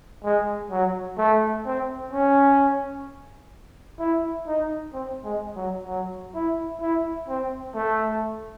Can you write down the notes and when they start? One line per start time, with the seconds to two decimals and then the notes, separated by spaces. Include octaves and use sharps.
0.24 G#3
0.71 F#3
1.18 A3
1.65 C4
2.12 C#4
3.99 E4
4.47 D#4
4.93 C4
5.25 G#3
5.56 F#3
5.87 F#3
6.35 E4
6.81 E4
7.28 C4
7.75 A3